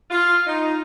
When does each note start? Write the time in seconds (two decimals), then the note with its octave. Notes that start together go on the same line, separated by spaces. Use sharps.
0.10 F4
0.47 D#4